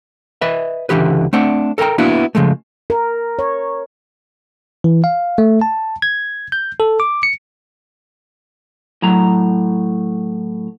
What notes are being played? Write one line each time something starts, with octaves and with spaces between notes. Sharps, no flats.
B4 D#5 E5
C#2 D3 E3 G4 B4
A3 C4 D4 F#5
A4 A#4 E5 G5 A#5
A#3 B3 D4 E4 F#4 B4
C#3 F3 G#3 A3
A#4
C#5
E3
F5
A3
A5
G#6
G6
A4
D6
C#7
A2 F#3 A#5